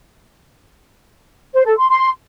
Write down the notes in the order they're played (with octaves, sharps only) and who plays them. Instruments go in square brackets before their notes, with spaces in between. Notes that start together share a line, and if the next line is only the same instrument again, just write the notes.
[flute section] C5
A4
C6
C6